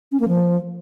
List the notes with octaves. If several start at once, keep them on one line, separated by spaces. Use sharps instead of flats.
C#4
A#3
F3